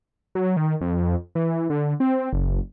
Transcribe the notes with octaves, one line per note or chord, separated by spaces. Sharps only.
F#3
D#3
F2
E3
D3
C4
F#1